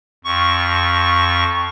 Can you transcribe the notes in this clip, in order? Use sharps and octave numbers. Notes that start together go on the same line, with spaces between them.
F2 C#6